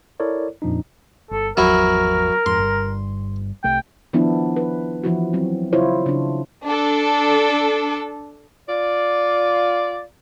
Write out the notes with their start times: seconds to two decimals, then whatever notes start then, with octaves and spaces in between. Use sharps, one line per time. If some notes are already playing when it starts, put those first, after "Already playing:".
0.20 E4 A4 A#4 C#5 D5
0.62 F2 A#2 F3 D4 D#4
1.31 G1 A4
1.57 G#1 E2 F3 F#3 E4 A#4
2.46 F2 G#2 C6
2.59 G1 G2 G3
3.64 C2 C3 A3 G5
4.13 D#3 F3 B3 D4 E4
4.56 B4
5.04 E3 F3 E4 F#4
5.33 F#3 C4
5.73 C#3 E4 F4 C5 C#5
6.06 C#3 D4
6.65 D4 A4
8.69 F4 D5